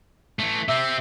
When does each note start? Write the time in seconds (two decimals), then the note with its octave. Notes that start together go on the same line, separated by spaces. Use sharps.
0.39 E3 A3
0.69 C3 C4 E5